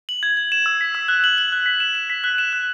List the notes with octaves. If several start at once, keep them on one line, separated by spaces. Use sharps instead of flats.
F#7
G#6
G#6
E7
E6
B6
E6
F#6
F#7
F#7
F#6
B6
E7
E7
B6
F#6
E7
F#6